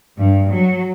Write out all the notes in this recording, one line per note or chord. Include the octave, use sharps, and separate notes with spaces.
G2
F#3